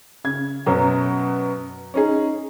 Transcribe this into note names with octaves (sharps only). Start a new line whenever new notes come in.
C#3 G#6
F#2 B2 F#3
C#4 D#4 G#4